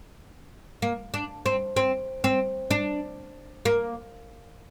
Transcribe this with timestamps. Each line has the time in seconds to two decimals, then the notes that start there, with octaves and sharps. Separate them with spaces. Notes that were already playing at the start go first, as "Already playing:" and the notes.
0.82 A#3
1.14 D4
1.46 C4
1.77 C4
2.24 C4
2.71 D4
3.65 A#3